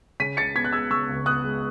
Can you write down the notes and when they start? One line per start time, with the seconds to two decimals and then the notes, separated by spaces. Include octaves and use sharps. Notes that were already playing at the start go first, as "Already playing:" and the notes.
0.20 C#3 B6 D#7
0.37 C#2 A6 C#7
0.55 B3 G#6 B6
0.65 F#6
0.73 G#3 E6 G#6
0.90 C#3 C#6 E6
1.09 C#2
1.26 B3 D#6 F#6
1.44 G#3